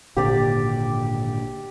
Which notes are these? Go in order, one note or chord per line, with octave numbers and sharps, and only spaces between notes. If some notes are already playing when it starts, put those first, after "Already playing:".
G#1 A#2 D3 G4 D5